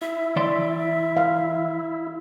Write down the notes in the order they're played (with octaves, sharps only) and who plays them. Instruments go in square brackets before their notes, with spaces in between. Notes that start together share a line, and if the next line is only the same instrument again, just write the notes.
[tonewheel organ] E4 [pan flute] E5
[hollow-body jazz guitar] E3 D5 C6
[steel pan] F5